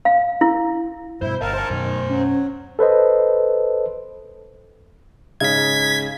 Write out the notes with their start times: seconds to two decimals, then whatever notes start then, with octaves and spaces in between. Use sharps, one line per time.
0.05 F5
0.41 E4
1.22 G2 B2 E4 C5
1.41 G1 A#4 D#5 F5 A5
1.53 C5 G#5 C6
1.70 F#2 B2 D#3
2.10 F#3 C#4
2.79 A4 B4 C5 D#5
5.40 G#2 C#3 D#4 G#6 B6